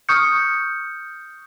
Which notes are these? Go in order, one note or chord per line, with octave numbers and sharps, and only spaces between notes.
C#6 D#6 F6 G6 C#7